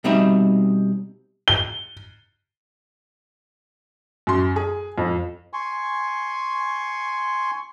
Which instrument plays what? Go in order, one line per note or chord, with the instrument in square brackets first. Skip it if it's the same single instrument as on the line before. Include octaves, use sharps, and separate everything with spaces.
[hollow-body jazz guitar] B2 G3 C4 D#4 E5 B5
[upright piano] G7
[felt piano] F#2 C6
G#4
F2
[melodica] G#5 C6 C#6